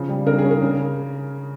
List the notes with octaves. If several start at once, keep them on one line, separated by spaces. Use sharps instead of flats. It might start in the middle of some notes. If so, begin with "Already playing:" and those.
Already playing: C#3 F3
G3
C#3 A#4
G#4
C#4
A#4
C#3